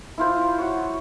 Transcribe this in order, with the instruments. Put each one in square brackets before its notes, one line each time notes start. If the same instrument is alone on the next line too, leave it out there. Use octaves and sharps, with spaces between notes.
[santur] E4 F4 C5
F#4 C#5